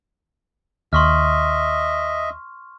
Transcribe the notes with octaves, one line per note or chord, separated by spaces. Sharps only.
D#2 D#5 E5 C6 C#6 F6